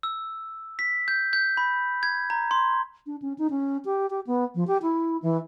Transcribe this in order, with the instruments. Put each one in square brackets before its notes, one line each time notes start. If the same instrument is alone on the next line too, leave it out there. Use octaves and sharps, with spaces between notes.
[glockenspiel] E6
B6
G6
G6
B5
G#6
A#5
C6
[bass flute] D4
C#4
D#4
C#4
G4
G4
B3
F3
G4
E4
E3